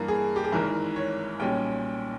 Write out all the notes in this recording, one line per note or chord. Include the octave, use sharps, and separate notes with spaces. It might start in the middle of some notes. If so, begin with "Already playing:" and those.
Already playing: G2 E3 A#3 A#4
G#4
G4
G#4
G#1 G#2 E3 A#4
C#5
B1 A#2 G3 C#4 G5